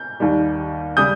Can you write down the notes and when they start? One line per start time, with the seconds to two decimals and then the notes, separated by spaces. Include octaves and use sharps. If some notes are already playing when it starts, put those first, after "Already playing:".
Already playing: G6
0.20 D#2 D#3 G3
0.97 C#3 G3 D#6 G6